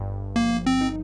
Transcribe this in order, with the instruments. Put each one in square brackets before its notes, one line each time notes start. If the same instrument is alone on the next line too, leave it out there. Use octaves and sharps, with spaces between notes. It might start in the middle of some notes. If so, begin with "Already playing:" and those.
Already playing: [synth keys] G1 G2
[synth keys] F3 [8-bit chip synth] A#3
[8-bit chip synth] C4
[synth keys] D#4